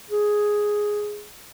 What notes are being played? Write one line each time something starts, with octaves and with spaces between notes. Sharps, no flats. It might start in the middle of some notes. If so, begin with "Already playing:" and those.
G#4